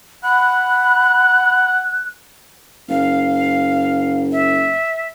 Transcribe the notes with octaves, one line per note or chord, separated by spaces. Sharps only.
F#5 B5 F#6
F#1 F5
E5